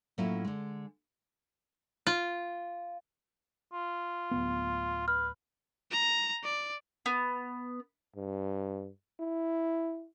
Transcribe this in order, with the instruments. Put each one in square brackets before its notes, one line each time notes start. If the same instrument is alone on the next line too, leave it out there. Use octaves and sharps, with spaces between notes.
[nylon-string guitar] A2 F#3 A#3 C#4 E4 F4
D3 G#3
[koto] F4
[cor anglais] F4
[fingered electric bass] D1 F2 B3
[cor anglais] B4 [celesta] F6
[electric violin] A#5
D5
[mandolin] B3
[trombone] G2
E4